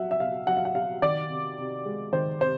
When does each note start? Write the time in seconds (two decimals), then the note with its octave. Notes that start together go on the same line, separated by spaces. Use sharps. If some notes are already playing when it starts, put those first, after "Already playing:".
Already playing: B2 F#3 E5 F#5
0.11 E5
0.20 B2 F5
0.47 F#3 F#5
0.57 F5
0.65 F#5
0.75 B2 F5
1.02 D#3 D5
1.30 C3
1.58 C3
1.86 G#3
2.13 D#3 C5
2.41 C3 C5